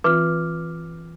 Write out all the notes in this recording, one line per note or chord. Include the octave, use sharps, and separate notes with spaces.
E3 C4 F4 B4 D6 F6